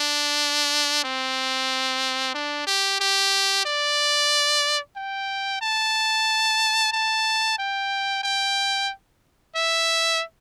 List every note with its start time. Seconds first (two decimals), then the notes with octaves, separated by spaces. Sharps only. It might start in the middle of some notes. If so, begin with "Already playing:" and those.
Already playing: D4
1.04 C4
2.34 D4
2.67 G4
3.00 G4
3.65 D5
4.96 G5
5.61 A5
6.92 A5
7.58 G5
8.23 G5
9.55 E5